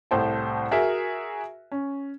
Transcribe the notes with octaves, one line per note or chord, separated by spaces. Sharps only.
C2 A2 C5 G5 A5
F#4 G#4 A#4 E5
C#4